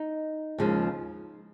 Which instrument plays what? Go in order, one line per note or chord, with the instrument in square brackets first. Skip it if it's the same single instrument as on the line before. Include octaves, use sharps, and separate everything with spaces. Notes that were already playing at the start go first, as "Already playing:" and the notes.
Already playing: [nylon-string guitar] D#4
D#2 C#3 F3 G#3